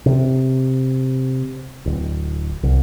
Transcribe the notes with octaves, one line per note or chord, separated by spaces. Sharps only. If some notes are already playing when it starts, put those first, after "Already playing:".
C3
D1
C2